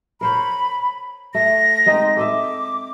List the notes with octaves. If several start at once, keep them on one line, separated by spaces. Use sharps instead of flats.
A#4 C5 C#5 B5
A3 A#6
G#3 C4 D#4
A4 D#5 E5 D6